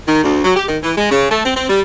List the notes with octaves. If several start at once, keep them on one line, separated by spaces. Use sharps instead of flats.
D#3
D2
F#3
G4
D#3
E3
G#3
C#3
A3
C4
C4
G3